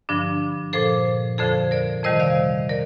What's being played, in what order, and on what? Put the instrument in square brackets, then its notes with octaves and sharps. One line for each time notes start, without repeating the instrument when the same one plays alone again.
[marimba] G2 D3 F3 D4
A#2 F3 A4 C5
F2 D3 F3 A4 C5
A#4 D5
F2 C3 D#3 G3 C5 D#5
D5 F5
A#4 D5